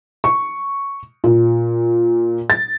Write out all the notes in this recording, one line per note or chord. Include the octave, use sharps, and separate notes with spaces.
C#6
A#2
A6